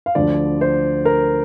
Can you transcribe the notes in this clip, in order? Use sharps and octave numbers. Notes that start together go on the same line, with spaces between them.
F5
D2 D3 F3 D5
C5
A#4